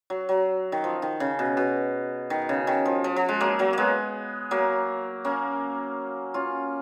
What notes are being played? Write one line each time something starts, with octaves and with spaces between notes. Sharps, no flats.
F#3
F#3
D#3
F3
D#3
C#3
B2
B2
D#3
C#3
D#3
F3
F3
F3
G#3
F#3 A#3
F#3 A#3
G#3 A#3 B3
F#3 A#3
A#3 C#4
C#4 F4